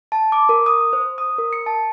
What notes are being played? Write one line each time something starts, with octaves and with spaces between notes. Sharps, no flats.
A5
D6
A#4
D#6
C5
D#6
A#4
C#7
A5